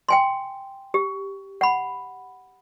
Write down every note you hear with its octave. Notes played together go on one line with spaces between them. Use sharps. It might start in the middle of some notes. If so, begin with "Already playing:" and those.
G5 G#5 C6
G4
F#5 B5